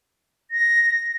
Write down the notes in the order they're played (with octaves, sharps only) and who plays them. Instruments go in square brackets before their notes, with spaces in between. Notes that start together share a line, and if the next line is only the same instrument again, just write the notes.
[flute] A#6